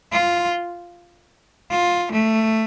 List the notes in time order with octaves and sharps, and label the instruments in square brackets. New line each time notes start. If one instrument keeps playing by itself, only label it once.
[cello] F4
F4
A3